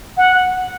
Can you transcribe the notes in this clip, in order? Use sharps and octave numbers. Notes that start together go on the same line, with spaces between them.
F#5